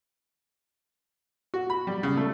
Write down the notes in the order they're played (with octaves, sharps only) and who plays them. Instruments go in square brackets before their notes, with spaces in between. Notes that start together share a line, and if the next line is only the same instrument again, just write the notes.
[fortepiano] F#4
B5
G3
C#3
A3